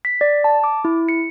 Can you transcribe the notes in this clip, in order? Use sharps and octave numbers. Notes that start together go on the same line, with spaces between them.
B6
D5
A5
D6
E4
C#7